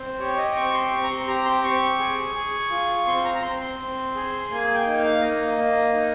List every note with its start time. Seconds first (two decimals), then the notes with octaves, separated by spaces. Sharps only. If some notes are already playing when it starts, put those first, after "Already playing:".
Already playing: C4 C5
0.19 G4 C#5
0.37 D#5
0.56 C4 C#6
0.74 C6
0.91 C4 C#6
1.03 A#5
1.10 C6
1.27 G4 A#5
1.45 C6
1.63 C4 C#6
1.99 G#4
2.35 G#4
2.71 F4
3.06 C4 C6
3.17 C6
3.24 A#5
3.35 A#5
3.42 C4 C6
3.61 C6
3.79 C4
4.15 G#4
4.50 A#3 G#5
4.74 G5
4.86 D#4
4.99 F5
5.22 A#3 D#5
5.58 A#3
5.94 D#4